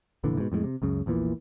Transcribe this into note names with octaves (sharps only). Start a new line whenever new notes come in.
F1 A#2 D3 E3
G#2 B2
F2 A2 F3 G#3
C3
C#2 F#2 C#3
A#1 E2 A#2 E3